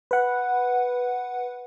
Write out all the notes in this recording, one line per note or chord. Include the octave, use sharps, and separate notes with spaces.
B4 F#5